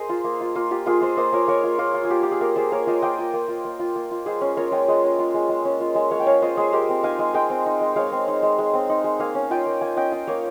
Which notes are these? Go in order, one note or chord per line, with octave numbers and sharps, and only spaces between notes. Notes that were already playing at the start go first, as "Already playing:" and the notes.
Already playing: G#4 A#4 C5 D#5
F4
A#3
F4
A#3 F4
F4 G4
A#3 F4 G#4
F4 C5 D#5
A#3 C5 D#5
F4 A#4 C#5
A#3 A#4 C#5
F4
A#3 F4
F4
G#4
A#3 G4
F4 G4
G#4
A#3 G4 A#4
F4 G#4 C5
A#3 A#4 C#5
F4 C5 D#5
A#3 D#5 G5
F4
A#3
F4
A#3
F4
A#3
F4
G#3 G#4 C5
C#4
F4 A#4 C#5
G#3 D#5 G5
G#3
C#4
F4
G#3
G#3
C#4
F4
G#3
G#3 C#5 F5
G5
C#4 C#5 F5
F4 C5 D#5
G#3 G#4 C5
G#3 G4 A#4
C4
D#4 F5 G#5
G#3
G#3 D#5 G5
C4
D#4
G#3
G#3 C#5 F5
C4
D#4
G#3
G#3
C4
D#4
G#3
A#3 F5 G#5
C#4
F4 D#5 G5
A#3
A#3 F5 G#5
C#4 D#5 G5
F4 D#5 G5
A#3 C#5 F5